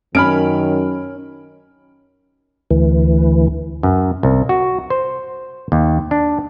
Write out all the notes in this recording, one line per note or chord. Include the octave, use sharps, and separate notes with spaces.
F#2 D#3 C#4 B5 F6 D7
D2 E3
F#2
C2
F#4
C5
D#2
D4